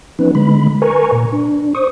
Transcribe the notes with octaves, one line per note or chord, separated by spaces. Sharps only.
F3 B3 C#4 D#4 B4
D3 G#3 B5
A#4 B4 G#5 A#5 C#6
A#2
D4
C5 C#6 D#6